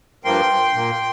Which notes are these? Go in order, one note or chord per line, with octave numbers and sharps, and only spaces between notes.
G2 F3 A#3 G5 C6
A#2 A#3